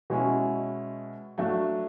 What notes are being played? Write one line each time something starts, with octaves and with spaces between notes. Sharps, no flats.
B2 G#3 C#4 E4
F#3 A3 D4